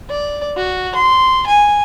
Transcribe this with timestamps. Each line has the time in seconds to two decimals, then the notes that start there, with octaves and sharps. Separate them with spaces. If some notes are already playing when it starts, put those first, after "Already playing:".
0.10 D5
0.57 F#4
0.95 C6
1.47 G#5